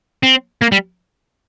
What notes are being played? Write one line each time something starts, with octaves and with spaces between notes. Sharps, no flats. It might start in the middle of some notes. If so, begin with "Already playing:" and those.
C4
A#3
G3